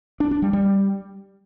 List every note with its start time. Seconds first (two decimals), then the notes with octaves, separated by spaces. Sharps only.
0.20 D4
0.31 D4
0.42 G3
0.53 G3